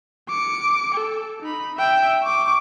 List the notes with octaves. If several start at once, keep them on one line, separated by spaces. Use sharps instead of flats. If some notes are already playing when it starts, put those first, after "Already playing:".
D6 C#7
A4
D#4 B5
E5 G5
C#6 D6